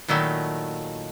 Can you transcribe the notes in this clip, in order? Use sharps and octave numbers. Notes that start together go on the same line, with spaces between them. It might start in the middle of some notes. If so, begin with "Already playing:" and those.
A#2 D#3 F#3 A3 E4